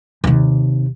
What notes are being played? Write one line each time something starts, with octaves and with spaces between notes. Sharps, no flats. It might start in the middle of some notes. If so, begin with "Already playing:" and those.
D#2 C3